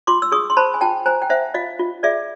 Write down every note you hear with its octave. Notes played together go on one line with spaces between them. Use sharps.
F4 C6 D6
E6
G#4 C#6 D#6
C6
C5 A5 B5
G#5
F4 G5 A5
C5 G#5 A#5
G5
C5 E5 F#5
F4 D#5 F5
F4
G#4 D5 E5